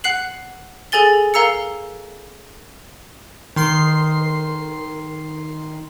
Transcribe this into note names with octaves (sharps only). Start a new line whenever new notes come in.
F#5 F#6 C7 F#7
G#4 A4 G#5 A6 G7
A#4 F5 A#5 E6 C#7
D#3 C6 C7